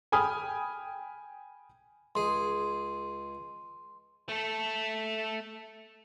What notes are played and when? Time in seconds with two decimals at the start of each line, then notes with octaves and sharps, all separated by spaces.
0.12 G5 G#5 B5 D#6 F6
2.15 C#2 G#4 C6
4.29 A3 A4